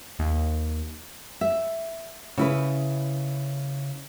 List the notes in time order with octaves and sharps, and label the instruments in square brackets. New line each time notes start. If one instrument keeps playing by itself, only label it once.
[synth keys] D#2
[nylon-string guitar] E5
C#3 E4 B4